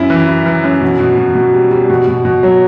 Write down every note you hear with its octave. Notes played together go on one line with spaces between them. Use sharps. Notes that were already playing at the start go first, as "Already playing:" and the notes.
Already playing: F#2 E4
E3
E4
E3
F#2
B2
B2
B2
B2
G3
G3
B2
B2
B2
F#3